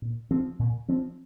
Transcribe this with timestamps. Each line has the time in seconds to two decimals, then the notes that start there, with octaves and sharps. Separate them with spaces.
0.02 A#2
0.31 F3 C4
0.59 A#2
0.88 F3 C4